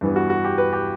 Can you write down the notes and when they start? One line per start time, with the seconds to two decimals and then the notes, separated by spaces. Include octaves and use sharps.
0.01 G2 E3 B3
0.16 F#4
0.30 F#4
0.44 G4
0.58 B4
0.73 G4